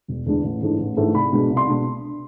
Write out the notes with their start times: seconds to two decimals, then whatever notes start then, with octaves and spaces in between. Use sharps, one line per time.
0.08 E1
0.26 E2 D3 G#3 D4
0.43 A1
0.62 G#2 E3 A3 D4
0.78 A1
0.97 G#2 E3 A3 D4
1.14 C2 B5
1.32 B2 G#3 D4
1.50 C2
1.57 C6
1.68 B2 G#3 D4